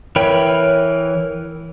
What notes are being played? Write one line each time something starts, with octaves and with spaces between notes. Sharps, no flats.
E3 A#4 C#5 G5 B5